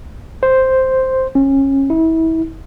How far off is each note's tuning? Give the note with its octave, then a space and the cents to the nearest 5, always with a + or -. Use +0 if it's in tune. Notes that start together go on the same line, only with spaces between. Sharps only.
C5 +0
C#4 -25
E4 -30